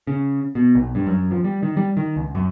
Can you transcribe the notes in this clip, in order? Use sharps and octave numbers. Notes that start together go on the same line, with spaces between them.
C#3
B2
B1
G2
F#2
F3
G3
D#3
G3
D#3
C#2
F#2